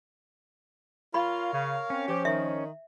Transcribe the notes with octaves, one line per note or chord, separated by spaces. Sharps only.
F4 A#4 C#5 F5 B5
C#3
C4 C#4
F3 G4
D#3 E5